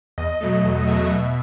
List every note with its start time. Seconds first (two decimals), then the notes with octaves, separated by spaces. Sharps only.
0.18 E2 D#5
0.41 B2 F#3 A3
0.64 E2 D#5
0.79 D#5
0.87 B2 F#3 A3 E5
1.11 B2